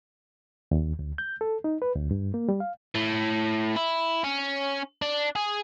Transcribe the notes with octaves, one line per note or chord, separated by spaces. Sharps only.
D#2
D2
G6
A4
D#4
B4
D2
G2
A#3
G3
F5
A2
E4
C#4
D4
G#4